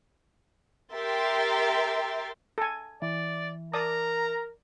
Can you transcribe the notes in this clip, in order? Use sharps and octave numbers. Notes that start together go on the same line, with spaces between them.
G4 A#4 E5 G5 C6 A6
A4 G#5
E3 D5
A#4 D5 A5 A#5 D#6